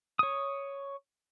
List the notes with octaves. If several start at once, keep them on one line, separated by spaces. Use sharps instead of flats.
C#5 D#6